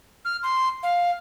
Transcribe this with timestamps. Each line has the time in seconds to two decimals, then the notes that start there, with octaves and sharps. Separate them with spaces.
0.25 F6
0.43 C6
0.83 F5